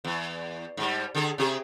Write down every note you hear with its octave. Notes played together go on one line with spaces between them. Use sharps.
E2
G#2 G3
D3 G#4 A4
C3 G4 G#4